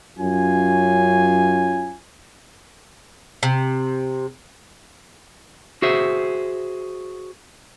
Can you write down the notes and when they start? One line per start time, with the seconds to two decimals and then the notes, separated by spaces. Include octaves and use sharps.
0.19 F#2 C#4 F4 G#5
3.43 C3
5.82 F#4 G#4 C5 E5